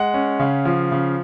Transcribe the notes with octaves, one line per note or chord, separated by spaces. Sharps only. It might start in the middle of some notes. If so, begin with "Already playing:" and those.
Already playing: G#3 F#5
C#4
C#3
F3
C#3